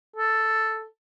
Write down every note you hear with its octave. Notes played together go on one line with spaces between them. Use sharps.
A4